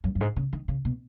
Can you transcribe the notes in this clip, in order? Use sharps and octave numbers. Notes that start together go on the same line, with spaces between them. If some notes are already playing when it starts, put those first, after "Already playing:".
F#2
F#2
G#2
C#3
D#3
C#3
B2